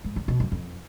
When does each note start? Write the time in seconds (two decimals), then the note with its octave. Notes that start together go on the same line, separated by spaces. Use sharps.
0.04 G#2
0.16 D3
0.28 B2
0.40 F#2
0.52 F2